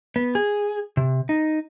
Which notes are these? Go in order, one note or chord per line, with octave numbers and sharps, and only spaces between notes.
B3
G#4
C3
D#4